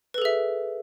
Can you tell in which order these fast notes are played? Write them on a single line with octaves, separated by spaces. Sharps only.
B4 A4 G#4 E5